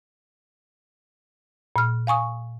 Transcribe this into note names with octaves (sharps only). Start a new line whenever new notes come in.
A#2 F6
F5 G#5 C#6 D#6